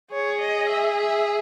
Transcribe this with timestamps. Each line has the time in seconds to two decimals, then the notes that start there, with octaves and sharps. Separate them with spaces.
0.12 G#4 C#5
0.41 D#5
0.70 E5
1.00 E5